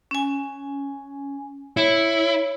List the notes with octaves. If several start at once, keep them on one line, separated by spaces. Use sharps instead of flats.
C#4 G#5
E4 C#5